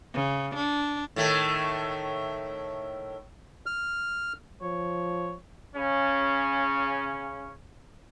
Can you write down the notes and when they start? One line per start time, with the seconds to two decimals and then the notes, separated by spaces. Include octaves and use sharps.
0.14 C#3
0.55 D4
1.16 A2 D#3 A3
3.66 F6
4.62 F3 C#5
5.76 C#3 C#4